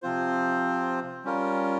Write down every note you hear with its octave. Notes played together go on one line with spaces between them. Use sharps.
C3 F3 C4 F4 C5
G3 C#4 F4 A#4